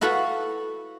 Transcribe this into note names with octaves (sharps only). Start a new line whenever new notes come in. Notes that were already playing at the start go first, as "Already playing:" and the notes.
E4 F#4 A4 B4 F5 F#5